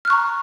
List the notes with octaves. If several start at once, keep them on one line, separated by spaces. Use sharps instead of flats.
A#5 C#6 F6 F#6